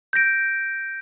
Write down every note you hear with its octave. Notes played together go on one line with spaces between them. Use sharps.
G6 A#6 D7